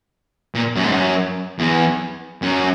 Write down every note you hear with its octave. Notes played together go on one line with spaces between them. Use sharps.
A#2
F#2
G#2
F#2
E2
F#2